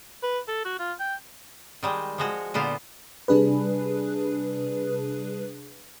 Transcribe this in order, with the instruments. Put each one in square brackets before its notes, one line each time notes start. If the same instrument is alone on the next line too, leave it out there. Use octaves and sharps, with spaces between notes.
[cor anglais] B4
A4
F#4
F4
G5
[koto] D#3 G3 G#3
F3 G#3 F#4
A#2 D3 B3 F4 C5
[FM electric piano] C3 G3 D4 G#4 B4